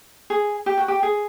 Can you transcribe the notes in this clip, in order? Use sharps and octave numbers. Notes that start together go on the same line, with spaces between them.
G#4
G4
F#4
G4
G#4